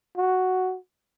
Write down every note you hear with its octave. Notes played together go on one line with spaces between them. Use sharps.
F#4